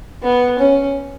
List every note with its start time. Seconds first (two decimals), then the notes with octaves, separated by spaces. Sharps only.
0.22 B3
0.59 C#4